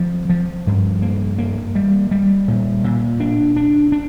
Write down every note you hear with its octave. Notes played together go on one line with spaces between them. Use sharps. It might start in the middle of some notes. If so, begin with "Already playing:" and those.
Already playing: F3 C4
F3
G2
A#3
A#3
G3
G3
A#2
A#2
D4
D4
D4